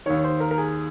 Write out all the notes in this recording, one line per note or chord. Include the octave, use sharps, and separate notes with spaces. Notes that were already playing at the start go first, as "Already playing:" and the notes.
D#2 D#3 C#5
C5
A#4
A#4
G#4